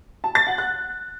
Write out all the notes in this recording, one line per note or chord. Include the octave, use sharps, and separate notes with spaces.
A5
A6
F#5
F#6